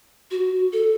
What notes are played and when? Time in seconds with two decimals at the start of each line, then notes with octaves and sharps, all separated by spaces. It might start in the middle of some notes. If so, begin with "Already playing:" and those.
0.31 F#4
0.73 A4